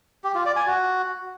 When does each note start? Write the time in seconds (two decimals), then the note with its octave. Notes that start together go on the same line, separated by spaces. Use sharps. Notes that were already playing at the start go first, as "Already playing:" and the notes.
0.24 G4
0.35 F4
0.45 D5
0.56 G#5
0.67 F#4